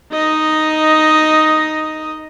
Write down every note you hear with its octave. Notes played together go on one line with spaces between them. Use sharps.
D#4 D#5